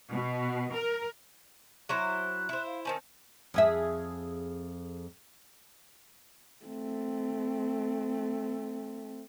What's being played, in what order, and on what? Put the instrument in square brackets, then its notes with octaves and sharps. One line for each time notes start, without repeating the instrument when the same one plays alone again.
[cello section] B2
A#4
[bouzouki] F#3 E4 C5 [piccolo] F#6
[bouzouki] E4 C5
[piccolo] F5
[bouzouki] D#3 C4 C#4 [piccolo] A5
[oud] F2 G#4 E5
[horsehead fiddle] A3 C4